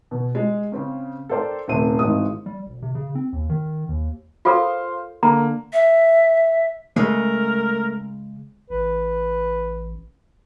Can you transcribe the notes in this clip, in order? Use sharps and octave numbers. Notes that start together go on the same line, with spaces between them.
B2
G#3
C#3 C4 C#4
A4 A#4 C5 D5 G5
D#1 C3 A3 C5 D#7
G#1 G#2 E3 G#3 D#6
G3
E1
C3
C#3
C4
D#2
D#3
D#2
F4 A4 A#4 C5 F5 C6
D3 A#3 A#5
E5
C#3 G#3 A3 A#4
A1 B4